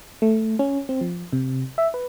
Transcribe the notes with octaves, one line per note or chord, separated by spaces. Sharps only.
A3
C#4
C4
F3
C3
E5
B4